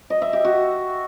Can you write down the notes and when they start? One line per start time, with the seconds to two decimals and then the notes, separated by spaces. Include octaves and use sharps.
0.10 D#5
0.22 E5
0.33 G4
0.45 F#4